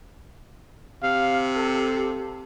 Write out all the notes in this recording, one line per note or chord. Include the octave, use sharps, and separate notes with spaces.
C3 F5
A4